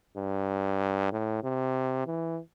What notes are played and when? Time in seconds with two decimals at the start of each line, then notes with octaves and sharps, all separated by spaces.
0.18 G2
1.12 A2
1.44 C3
2.06 E3